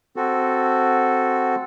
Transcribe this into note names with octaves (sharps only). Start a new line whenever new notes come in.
C4 F#4 A4